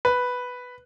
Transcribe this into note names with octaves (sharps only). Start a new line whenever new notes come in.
B4